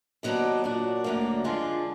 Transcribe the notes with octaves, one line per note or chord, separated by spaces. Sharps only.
D#2 D#3 F#3 B3 D4
A#2 F#3 D4 F#4
D2 D3 F#3 A#3
F2 D3 G#3 D4 F4